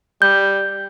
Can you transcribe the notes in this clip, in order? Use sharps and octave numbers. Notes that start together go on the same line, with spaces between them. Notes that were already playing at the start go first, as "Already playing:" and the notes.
G3 G6